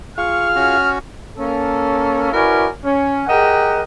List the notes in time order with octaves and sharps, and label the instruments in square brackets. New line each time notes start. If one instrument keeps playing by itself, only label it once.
[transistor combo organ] F4 G#4 F5 [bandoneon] C#6 [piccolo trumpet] F6
[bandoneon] C#4 F#4
[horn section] A#3 C#4 A4
C#4 E4 F#4 A#4 B4 D5
C#4
G4 G#4 A#4 D#5 F#5